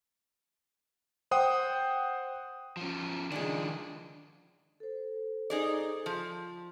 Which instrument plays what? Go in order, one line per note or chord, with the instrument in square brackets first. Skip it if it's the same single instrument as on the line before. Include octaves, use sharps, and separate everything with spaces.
[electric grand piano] C5 F#5 G5 D#6
[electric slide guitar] F3 C#4
[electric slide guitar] D#3 F3 [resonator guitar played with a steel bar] G#3 D4
[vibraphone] A4 C5
[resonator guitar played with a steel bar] D#4 G#4 D5
F3